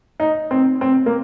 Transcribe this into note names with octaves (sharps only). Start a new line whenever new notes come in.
D#4
C4
C4
A#3